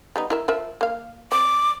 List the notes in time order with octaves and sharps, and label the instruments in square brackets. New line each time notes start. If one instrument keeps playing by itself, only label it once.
[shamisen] G3 B3 D#4
E4 A#4 E5
F3 A#4 E5
A#3 F5
[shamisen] C4 [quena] D6